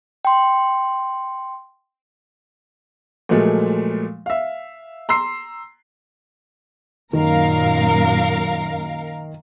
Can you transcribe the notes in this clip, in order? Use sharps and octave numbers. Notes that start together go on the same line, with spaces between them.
G5 C6
A#2 F3 F#3 G#3 A3
E5 F5
A#5 C6 E6 C7
F#2 A#2 D#3 A#4 F5